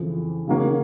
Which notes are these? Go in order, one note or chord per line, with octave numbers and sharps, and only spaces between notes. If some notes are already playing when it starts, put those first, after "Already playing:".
Already playing: F2 C#3 E3
C#3 F#3 A#3 C#4